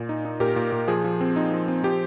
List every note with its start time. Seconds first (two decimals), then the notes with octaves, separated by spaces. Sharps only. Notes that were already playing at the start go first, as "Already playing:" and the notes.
Already playing: A#2
0.09 D#4
0.25 D#4
0.40 A#2 G4 A#4
0.56 A#2
0.72 A#2
0.88 F3 G#4
1.04 F3
1.21 C4
1.36 D#4
1.52 F3
1.68 C4
1.84 F3 G4